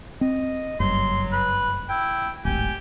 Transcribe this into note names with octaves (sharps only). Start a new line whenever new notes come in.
C4 D#5
F#1 G2 F#3 C6
B4
E4 G5
D1 G#1 G4 G#5